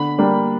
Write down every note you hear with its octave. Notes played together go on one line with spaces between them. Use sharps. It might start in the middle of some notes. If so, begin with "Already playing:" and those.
Already playing: D3 B5
G3 A#3 D4